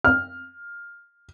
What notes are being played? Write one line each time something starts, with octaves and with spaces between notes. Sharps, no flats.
F6